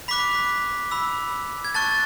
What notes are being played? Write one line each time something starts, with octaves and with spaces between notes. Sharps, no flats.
B5 D6 F#6 B6
B5 E6
G#6
A5 C#6 F#6 A6